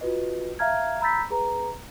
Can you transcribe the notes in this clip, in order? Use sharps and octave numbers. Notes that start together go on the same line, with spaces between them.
F4 F#4 B4 D#5
E5 F5 A5 A#5 F6 G#6
A#5 B5 E6 G6 A6 B6
G#4 B4 A#5